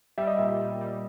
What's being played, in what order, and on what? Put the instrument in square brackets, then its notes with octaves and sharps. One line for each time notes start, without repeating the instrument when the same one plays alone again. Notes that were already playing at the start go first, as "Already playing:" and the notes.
[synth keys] G3 [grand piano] E5
[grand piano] D#5
[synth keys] A#2 [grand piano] E5
[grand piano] E5
[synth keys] G3
G3